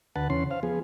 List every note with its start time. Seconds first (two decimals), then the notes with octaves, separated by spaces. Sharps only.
0.16 D2 B4 F#5 A5
0.30 E2 C#3 C#4 C6
0.51 C5 F5
0.63 F3 B3 G#4